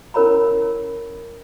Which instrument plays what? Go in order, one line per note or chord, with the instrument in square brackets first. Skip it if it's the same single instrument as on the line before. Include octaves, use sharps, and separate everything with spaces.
[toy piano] C#4 E4 A#4 C#5 A#5 B5